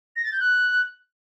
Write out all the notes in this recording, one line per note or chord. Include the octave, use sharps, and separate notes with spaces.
A#6
A6
G6
F#6